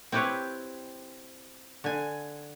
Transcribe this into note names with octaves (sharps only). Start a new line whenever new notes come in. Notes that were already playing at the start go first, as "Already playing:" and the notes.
C4 E4 G4 B4 C#5
D3 G#5